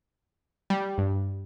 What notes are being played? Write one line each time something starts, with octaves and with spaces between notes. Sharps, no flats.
G3
G2